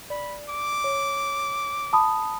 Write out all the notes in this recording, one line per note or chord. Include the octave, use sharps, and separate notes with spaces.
D5 B5
D6
C#5
A5 B5 D#6